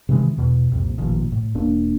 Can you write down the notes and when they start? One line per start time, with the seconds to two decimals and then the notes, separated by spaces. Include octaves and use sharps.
0.09 C3 D#3 E3 G#3
0.38 E2 B2
0.72 C2 F2 A#2
0.98 A1 A#2 D#3 F3
1.32 A2
1.55 E1 A#3 D4